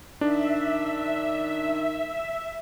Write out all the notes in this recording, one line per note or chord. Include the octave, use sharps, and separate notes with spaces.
D#3 D4 E5